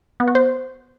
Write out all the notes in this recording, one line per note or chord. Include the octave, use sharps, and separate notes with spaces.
B3
F#4
C5